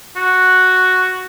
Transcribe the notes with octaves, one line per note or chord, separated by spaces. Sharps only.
F#4